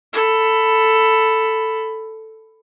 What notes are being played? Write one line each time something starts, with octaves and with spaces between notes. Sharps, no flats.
A4 B5